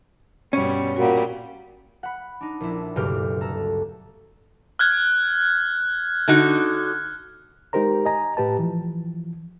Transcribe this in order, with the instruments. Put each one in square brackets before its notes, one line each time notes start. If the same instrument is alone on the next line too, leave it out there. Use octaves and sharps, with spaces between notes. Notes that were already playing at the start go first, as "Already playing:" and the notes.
[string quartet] G2 B2 G3 [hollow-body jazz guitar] C#4
[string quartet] A#2 G3 [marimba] F#4 A#4 F#5
[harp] F#5 B5
D4 D#4
A#1 E4
F#1 D2 G2 B2 G4 F6
A4 A#5 E6
[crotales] F6 F#6 G#6
[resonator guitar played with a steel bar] D3 D#4 F#4
[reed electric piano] G#3 D#4 G4 A#4 C5 A#5
D#5 G#5 A#5
A2 G4 B4 A5
E3 F3